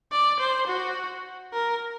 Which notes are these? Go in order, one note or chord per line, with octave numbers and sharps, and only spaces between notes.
D5
C5
F#4
A#4